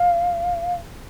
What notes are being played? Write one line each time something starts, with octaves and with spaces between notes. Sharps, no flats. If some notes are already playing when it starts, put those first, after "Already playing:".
Already playing: F5